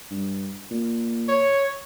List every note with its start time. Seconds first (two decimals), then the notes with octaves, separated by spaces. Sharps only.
0.11 G2
0.71 A#2
1.29 C#5